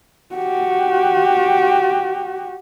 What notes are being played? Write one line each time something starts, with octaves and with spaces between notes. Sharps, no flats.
F#4 G4